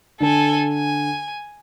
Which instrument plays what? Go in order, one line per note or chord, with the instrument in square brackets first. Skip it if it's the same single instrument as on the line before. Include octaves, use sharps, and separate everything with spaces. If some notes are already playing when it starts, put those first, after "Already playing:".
[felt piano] D3 [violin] A4 G#5
[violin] G#5